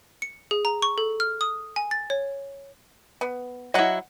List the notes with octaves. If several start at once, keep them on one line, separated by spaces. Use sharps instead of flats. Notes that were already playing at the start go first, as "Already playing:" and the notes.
C#7
G#4
A#5
C#6
A4
F6
D#6
G#5
A6
C#5
B3
F#3 E4 D#5 F#5